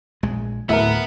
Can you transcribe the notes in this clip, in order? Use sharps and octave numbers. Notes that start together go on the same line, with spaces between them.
A#1 G#3
D1 A2 B3 A#4 E5